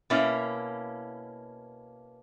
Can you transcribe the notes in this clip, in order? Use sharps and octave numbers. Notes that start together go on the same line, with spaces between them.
B2 A#3 C#4 E4